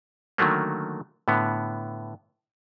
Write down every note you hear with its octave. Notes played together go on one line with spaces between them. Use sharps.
D3 D#3 F#3 A3 A#3
A2 D3 B3